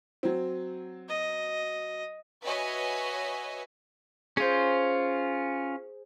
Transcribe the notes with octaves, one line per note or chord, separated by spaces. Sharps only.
F#3 C4
D#5
F#4 B4 C#5 D#5 E5 G#5
C#4 F4 G#4 C5